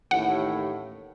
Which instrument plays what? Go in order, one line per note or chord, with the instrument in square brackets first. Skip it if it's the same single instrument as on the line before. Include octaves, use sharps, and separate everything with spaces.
[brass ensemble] A1 D#2 A2 [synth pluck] F#5